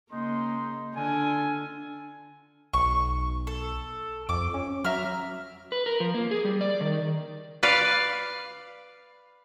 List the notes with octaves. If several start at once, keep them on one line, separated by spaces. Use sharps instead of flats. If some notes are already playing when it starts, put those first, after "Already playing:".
C#3 G#3 A#3 D#4 C6
D3 D4 F4 A4 G#5
B1 C#6
A4
F2 D6
C#4
F#3 E5 A#5 F6
B4
A#4
F3
A#3
G#4
G3
D5
D#3
B4 D5 F5